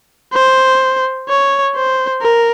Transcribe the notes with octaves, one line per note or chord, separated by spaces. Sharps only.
C5
C#5
C5
A#4